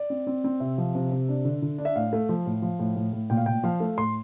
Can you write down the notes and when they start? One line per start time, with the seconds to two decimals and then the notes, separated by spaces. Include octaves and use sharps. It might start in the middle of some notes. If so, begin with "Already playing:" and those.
Already playing: D5
0.10 C4
0.27 C4
0.44 C4
0.60 C3 E5
0.78 F3
0.95 C3
1.12 C3
1.29 D4
1.45 D3
1.62 D3
1.78 D4
1.85 E5
1.96 A2 F5
2.13 A3
2.29 F3
2.46 A2
2.62 F3
2.79 A2
2.96 A2
3.13 A2
3.30 A#2 G5
3.37 F5
3.46 A#2 G5
3.63 F3 F5
3.80 A3
3.97 A2 C6